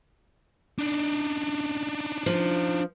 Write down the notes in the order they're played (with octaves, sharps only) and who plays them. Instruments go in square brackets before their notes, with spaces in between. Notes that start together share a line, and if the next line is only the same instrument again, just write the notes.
[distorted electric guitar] D4 D#4
[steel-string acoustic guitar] F3